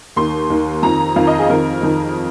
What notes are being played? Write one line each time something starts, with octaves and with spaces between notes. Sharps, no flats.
D#2 D#3 C6
D#2 D#3
F2 D#3 A#5
F2 D#3 F5
D#5
G#4
F2 D#3 A#4
F2 D#3